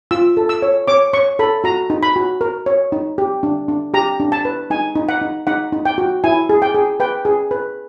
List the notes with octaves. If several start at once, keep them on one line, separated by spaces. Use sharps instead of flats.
F4 E6
A4
E6
C#5
C#5 D6
C#5 C#6
A4 B5
F#4 A#5
D#4
B5
F#4
A#4
C#5
D#4
G4
D4
D4
G4 A#5
D4
A5
B4
D#4 G#5
D#4
F#5
D#4
D#4 F#5
D#4
G5
F#4
E4 G#5
G#4
G5
G#4
B4 G5
G#4
B4